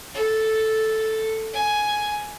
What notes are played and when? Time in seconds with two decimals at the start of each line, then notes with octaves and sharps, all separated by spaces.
0.14 A4
1.53 G#5